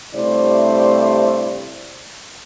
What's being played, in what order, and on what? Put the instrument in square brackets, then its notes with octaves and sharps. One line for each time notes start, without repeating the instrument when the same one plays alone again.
[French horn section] G2 C3 A3 E4 C5 D5